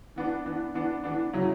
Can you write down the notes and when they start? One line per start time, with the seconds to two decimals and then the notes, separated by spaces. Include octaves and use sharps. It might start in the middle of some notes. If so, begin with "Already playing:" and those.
0.16 E3 B3 D4
0.46 E3 B3 D4
0.74 E3 B3 D4
1.04 E3 B3 D4
1.33 C#3 F#3 C#4 E4